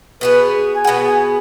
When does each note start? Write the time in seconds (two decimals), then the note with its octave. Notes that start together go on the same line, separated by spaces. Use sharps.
0.21 B2 B3 G#4 B4
0.75 G#5
0.84 B2 B3 G#4 F#5
1.06 G#5